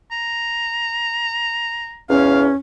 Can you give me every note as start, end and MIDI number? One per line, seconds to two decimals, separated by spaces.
0.12 2.00 82
2.09 2.49 40
2.09 2.53 61
2.09 2.41 77